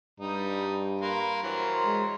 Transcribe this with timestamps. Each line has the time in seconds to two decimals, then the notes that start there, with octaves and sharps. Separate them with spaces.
0.20 G2 G3 D#4
1.01 A#3 B4 C6
1.43 E3 F#3 A#4 C5
1.84 G#3